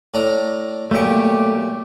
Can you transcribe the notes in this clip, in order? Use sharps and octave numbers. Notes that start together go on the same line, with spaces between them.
A2 D4 A#5
B1 A#2 A3 G4 C#6